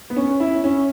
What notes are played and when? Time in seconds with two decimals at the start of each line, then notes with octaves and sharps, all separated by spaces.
0.10 B3
0.16 C#4
0.40 E4
0.64 C#4